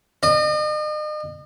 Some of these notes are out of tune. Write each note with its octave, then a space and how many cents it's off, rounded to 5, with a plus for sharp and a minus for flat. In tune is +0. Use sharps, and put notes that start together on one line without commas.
D#5 -40